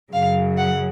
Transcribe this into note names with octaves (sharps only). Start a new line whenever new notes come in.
F#2 C#3 F#3 F5
F#5